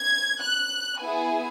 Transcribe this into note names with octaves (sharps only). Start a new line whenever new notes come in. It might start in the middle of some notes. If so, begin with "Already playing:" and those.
Already playing: G#6
F#6
B3 E4 G#4 G#5